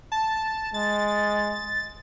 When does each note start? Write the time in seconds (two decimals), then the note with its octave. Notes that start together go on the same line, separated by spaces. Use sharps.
0.12 A5
0.74 G#3 A6